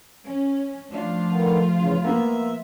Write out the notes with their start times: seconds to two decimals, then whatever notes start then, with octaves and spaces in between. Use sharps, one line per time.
0.24 C#4
0.88 F3 A3 D4 F4
1.30 D3 D#3 B3
1.74 E2 C#3
2.04 A#3 B3 E5